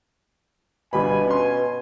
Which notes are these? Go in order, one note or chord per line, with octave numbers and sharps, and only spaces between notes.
G1 B2 G3 G#5 B5
C#4 C6